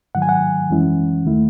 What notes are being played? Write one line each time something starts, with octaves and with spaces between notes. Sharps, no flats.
G#2 D#3 F#3 F#5
G#5
F#5
F#2 E3 G#3 C#4 E4
D#2 D#3 A3 E4